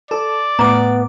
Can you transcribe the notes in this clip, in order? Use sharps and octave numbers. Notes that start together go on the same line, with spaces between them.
A4 D5
A2 B3 A#5 D6